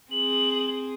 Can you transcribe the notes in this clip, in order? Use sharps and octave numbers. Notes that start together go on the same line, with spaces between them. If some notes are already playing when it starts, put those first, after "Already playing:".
C4 G#4 F#7